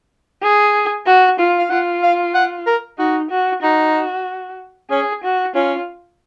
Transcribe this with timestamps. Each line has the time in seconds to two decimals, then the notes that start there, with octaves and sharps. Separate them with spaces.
0.42 G#4
1.06 F#4
1.39 F4
1.59 F5
1.70 F4 F#5
2.03 F5
2.34 F#5
2.67 A#4
2.98 D#4 F#4
3.30 F#4
3.63 D#4 F#4
4.90 C#4 G#4
5.23 F#4
5.55 C#4 F4